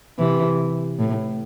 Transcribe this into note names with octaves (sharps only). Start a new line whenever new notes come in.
C3 E3
A2